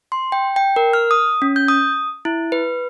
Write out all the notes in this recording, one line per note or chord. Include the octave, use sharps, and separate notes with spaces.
C6
G5
G5
A#4
F6
D#6
C#4
G6
D#6
E4
B4